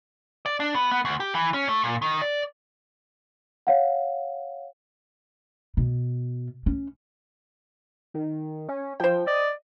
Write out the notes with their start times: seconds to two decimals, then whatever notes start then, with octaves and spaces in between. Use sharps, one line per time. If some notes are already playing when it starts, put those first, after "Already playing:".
0.46 D5
0.60 D4
0.75 B3
0.91 B3
1.05 D2
1.20 G4
1.35 E3
1.54 C#4
1.69 A3
1.84 A#2
2.02 D#3
2.22 D5
3.67 C#5 F5 F#5
5.77 B2
6.66 C#4
8.14 D#3
8.69 C#4
9.00 F3 C5 G5
9.27 D5 D#5